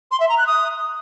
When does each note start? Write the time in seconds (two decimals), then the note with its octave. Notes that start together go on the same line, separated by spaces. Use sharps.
0.11 C6
0.20 E5
0.29 A#5
0.38 F#6
0.47 D#6